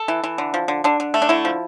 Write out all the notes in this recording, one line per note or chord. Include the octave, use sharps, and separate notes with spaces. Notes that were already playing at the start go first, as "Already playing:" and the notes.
Already playing: A4
E3
E3
D3
F3
D3
D3 D4
D3
A3
D4
D3 E4
F3